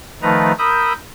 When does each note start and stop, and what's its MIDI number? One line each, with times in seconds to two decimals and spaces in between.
0.22 0.52 51
0.22 0.52 53
0.22 0.52 57
0.22 0.52 63
0.22 0.52 71
0.22 0.52 82
0.59 0.93 70
0.59 0.93 83
0.59 0.93 87
0.59 0.93 88
0.59 0.93 91